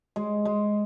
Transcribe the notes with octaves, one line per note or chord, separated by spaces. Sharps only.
G#3
G#3